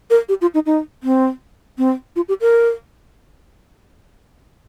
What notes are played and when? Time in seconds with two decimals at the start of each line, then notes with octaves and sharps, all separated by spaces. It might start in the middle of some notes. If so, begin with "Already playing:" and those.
0.10 A#4
0.29 G4
0.41 F4
0.54 D#4
0.66 D#4
1.03 C4
1.78 C4
2.16 F4
2.28 G4
2.41 A#4